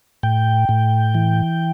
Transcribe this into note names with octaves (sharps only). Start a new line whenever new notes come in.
A2 G5
A2
E3